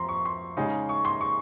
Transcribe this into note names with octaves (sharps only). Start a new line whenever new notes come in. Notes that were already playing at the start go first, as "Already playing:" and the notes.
Already playing: F2 A#5 C6
C#6
C6
C#3 G#3 D#4
C#6
C6
C#6